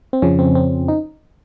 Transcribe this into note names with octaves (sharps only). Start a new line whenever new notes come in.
C4
F2 C#3 F3 C#4
C4
C4
D#4